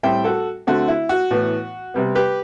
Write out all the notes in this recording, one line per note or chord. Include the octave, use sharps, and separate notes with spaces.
A2 G3 C4 E5 G5
F#4 A4
D3 A3 C4 F#4
E4
F#4
A2 E3 B3
C3 G3 B3
G4 B4